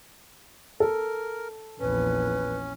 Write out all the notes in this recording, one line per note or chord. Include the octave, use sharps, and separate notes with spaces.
A4 A#4
A#1 E2 C#4 B4